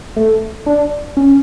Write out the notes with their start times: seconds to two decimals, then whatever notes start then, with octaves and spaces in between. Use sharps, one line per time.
0.16 A3
0.66 D4
1.17 C#4